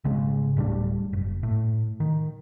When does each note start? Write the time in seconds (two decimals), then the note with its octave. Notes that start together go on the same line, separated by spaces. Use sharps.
0.04 G#1 C#3 G#3
0.57 D1 A2 G3 D4
1.13 F#1
1.43 A2
2.00 D#3